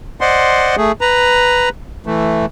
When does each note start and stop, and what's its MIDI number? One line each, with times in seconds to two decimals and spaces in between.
0.21 0.76 72
0.21 0.76 74
0.21 0.76 75
0.21 0.76 78
0.21 0.76 84
0.77 0.92 57
0.77 0.92 68
1.01 1.69 71
1.01 1.69 82
2.06 2.46 52
2.06 2.46 57